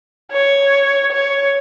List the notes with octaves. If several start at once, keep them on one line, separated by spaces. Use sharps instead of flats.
C#5
C#5